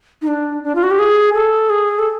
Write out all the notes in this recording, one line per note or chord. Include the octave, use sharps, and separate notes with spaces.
D#4
D4
D4
F4
F#4
G4
G#4
A4
G#4
A4